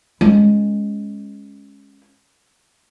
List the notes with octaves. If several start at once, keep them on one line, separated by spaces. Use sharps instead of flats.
G#3 C#4